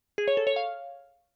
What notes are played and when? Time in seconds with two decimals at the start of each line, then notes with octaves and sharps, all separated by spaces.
0.18 G#4
0.28 C#5
0.37 A4
0.47 C#5
0.56 F5